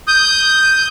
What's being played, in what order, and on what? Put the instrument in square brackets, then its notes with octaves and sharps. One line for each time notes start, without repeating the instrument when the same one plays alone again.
[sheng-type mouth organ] D#6 G6